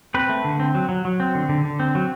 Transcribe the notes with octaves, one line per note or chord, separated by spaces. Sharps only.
C4 B4
A3
D3
C4
F#3
F#3
F#3
C4
D3
D3
D3
C4
F#3